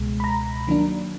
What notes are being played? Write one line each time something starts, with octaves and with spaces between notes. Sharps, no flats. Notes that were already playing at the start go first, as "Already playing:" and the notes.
Already playing: C#2 B2 G#3
B5
A#5
D#3 F#3 A#3 D4